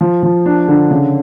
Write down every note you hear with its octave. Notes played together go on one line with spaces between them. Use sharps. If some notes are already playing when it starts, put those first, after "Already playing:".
F3
F3
D4
D3
C#3